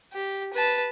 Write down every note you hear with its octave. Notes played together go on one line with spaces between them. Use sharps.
G4
B4 A5